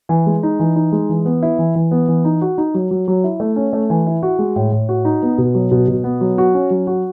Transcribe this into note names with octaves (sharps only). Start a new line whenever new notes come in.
E3
G#3
D#4
E3
D#4
G#3
E3
B3
E4
E3
E3
B3
E3
D#4
F#4
D#4
F#3
F#3
F#3
E4
A3
C#4
A3
E3
E4
F#4
G#3
A2
A2
F#4
D#4
B3
B2
F#3
B2
B2
B3
F#3
F#4
C#4
F#3
F#4